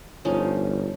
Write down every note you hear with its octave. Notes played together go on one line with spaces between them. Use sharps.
G1 F3 C#4 D#4